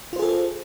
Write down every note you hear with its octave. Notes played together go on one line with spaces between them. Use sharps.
F4 G#4 A4 C5